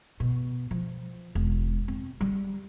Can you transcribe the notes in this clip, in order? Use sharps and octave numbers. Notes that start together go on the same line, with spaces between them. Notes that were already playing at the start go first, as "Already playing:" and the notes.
B2
F3
E1
C4
G3